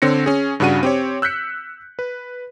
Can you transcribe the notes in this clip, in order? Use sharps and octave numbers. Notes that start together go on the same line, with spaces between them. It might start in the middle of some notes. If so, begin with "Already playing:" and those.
D3 C4 C#5 A#6 C#7
C#4 G#4
G2 C#3 D4 F#4 F#5 D#7
C4 G4 C#5
E6 F#6 G6 B6 C#7
B4